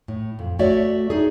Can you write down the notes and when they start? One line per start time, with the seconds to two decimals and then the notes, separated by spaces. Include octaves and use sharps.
0.08 A2
0.39 F2
0.59 A3 F#4 C#5 D5 E5
1.10 D#4 G#4